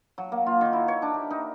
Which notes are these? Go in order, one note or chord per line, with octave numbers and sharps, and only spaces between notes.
F#3
A#3
F4
D#3
E4
C#5
D4
G4
D#4